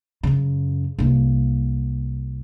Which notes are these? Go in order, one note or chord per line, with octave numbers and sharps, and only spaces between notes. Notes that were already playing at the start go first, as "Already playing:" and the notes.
F#2 C#3
C2 A#3